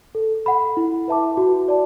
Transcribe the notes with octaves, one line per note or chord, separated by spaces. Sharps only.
A4
F#5 B5
E4
B4 E5 A5 D6
F#4
D5 A5